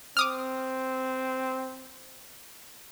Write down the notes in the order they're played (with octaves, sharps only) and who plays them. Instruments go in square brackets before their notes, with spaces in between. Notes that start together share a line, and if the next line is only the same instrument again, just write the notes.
[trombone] C4 [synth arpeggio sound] D6 D#6 F6